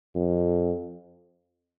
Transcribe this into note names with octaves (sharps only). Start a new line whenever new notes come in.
F2